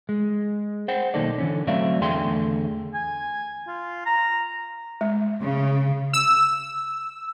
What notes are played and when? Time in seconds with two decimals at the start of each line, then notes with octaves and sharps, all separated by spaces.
0.09 G#3
0.88 C5 F#5 G5
1.14 B1 D#3 A#3 D#4 A4 D5
1.38 D3 E3 C#4
1.67 F#3 A3 C4 D5 E5 F5
2.01 E2 D3 A3 G#4 G5 C6
2.94 G#5
3.67 F4
4.06 A#5
5.01 G#3
5.41 C#3
6.13 E6